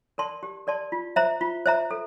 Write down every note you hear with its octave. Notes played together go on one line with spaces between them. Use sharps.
A#4 D5 A5 C6
G4
A#4 D5 A5 C6
F4
C5 E5 A#5
F4
C5 E5 A#5
A4